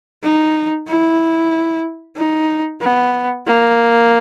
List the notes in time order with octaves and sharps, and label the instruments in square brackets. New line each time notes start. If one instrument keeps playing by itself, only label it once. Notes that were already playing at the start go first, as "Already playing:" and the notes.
[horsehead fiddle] D#4
E4
D#4
B3
A#3